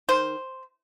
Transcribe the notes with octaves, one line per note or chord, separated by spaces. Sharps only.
D#3 C5